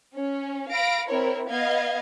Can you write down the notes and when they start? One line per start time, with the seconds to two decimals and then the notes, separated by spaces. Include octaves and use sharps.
0.15 C#4
0.72 F5 B5 A#6 D7
1.09 C4 E4 A#4 C#5
1.49 B3 D#5 F5 G#6